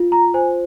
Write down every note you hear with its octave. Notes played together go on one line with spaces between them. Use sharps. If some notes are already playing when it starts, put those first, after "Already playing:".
Already playing: F4
A#5
C5 G#5